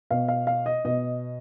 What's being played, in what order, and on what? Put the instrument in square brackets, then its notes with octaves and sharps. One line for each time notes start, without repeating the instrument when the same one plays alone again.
[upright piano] B2 F5
F5
F5
D#5
B2 D#5